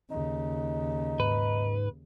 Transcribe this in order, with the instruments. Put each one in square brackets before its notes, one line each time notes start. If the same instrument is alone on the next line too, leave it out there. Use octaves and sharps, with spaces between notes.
[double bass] D#2 C#3 [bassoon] D#4
[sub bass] G#2 [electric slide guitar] B4